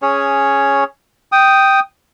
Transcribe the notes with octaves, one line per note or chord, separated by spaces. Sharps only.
C#4 G#4 C#5
G5 D#6